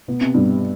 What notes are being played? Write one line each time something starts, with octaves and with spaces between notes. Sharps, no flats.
B2 B3
C3
G2 B2 G3